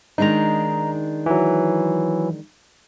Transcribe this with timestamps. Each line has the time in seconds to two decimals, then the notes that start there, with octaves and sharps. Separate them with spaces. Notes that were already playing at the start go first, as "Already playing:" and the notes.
0.18 D#3 G#3 D4 D#4 A#5
1.26 E3 F#3